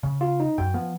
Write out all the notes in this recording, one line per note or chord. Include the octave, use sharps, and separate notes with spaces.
C#3
F4
D#4
F#2 G5
F3 B3